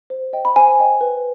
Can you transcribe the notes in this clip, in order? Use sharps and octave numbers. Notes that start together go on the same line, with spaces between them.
C5
D#5 G5
B5
C5 G#5
D#5 G5
B4